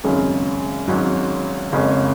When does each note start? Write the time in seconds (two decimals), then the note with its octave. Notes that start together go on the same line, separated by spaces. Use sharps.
0.04 G#1 F#2 C#3 G#3 C#4
0.88 G#1 G#2 F#3 C#4
1.72 F#1 F2 C#3 G#3 C#4